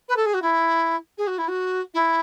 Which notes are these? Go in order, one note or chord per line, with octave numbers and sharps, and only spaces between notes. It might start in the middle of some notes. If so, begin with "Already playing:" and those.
B4
A4
G#4
F#4
E4
G#4
F#4
E4
F#4
E4